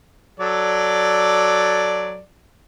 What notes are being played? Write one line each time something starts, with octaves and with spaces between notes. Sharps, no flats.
F#3 A4 D5